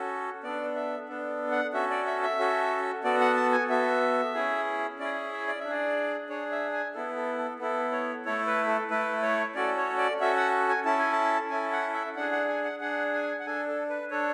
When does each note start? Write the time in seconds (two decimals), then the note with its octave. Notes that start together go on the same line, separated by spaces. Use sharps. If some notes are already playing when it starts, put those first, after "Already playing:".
Already playing: C#4 F#4 A4
0.43 B3 D4 A4 D5
0.76 E5
1.08 B3 D4 A4
1.52 F#5
1.73 C#4 F#4 A4 E5
1.90 D5
2.06 E5
2.23 E5
2.39 C#4 F#4 A4
3.04 B3 F#4 A4 D5
3.21 F#5
3.36 A5
3.52 G#5
3.69 B3 F#4 A4 E5
4.34 C#4 E4 G#4
4.99 C#4 E4 G#4 D5
5.32 E5
5.47 D5
5.60 D4 E5
5.69 G#4 D5
6.29 D4 G#4 C#5
6.52 E5
6.73 G#5
6.94 B3 E4 A4
7.16 A4
7.38 A4
7.60 B3 E4 A4
7.92 C#5
8.25 A3 E4 A4 C#5
8.47 B4
8.68 A4
8.90 A3 E4 A4 B4
9.22 C#5
9.55 C#4 F#4 A4 D5
9.77 C#5
9.98 D5
10.20 C#4 F#4 A4 E5
10.36 F#5
10.69 G#5
10.85 C#4 E4 A4 A5
10.99 G#5
11.12 A5
11.50 C#4 E4 A4 G#5
11.72 F#5
11.94 E5
12.16 D4 G#4 F#5
12.32 F#5
12.48 G#5
12.64 F#5
12.80 D4 G#4 F#5
13.14 G#5
13.40 F#5
13.46 D4 A4 G#5
13.68 A4
13.90 B4
14.11 D4 A4 C#5